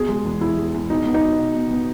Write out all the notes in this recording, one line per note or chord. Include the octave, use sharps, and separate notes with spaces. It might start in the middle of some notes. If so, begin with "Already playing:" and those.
Already playing: B2 G#4
G#3
E2
E2 E4
G#3
E2
B2 D#4
B3
D#4
B2
B2
B2
B3